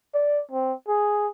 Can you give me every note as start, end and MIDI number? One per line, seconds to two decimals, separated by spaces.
0.14 0.42 74
0.52 0.73 60
0.88 1.28 68